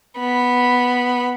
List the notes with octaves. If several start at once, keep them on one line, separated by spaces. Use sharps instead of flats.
B3 B5